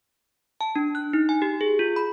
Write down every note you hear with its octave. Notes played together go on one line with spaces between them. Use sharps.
A5
D4
F#6
D#4
G#5
G4
G#4
F4
B5